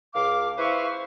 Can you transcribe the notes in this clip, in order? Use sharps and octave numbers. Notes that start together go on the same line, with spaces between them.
C#2 F5 D6
E4 B4 C5 E5 F5 C#6